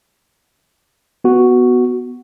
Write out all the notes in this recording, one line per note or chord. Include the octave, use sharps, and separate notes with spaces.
B3 F#4